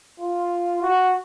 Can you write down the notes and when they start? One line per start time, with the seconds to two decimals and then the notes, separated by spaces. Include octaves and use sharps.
0.20 F4
0.83 F#4